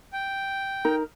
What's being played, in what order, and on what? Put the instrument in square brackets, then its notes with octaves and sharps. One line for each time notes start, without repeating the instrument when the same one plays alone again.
[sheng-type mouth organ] G5
[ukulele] D#4 A#4